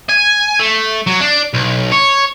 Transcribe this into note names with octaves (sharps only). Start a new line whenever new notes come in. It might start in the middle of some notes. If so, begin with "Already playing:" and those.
G#5
A3
F#3
D4
B1
C#5